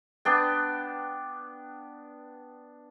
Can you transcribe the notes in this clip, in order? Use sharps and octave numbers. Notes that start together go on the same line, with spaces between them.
B3 D4 G5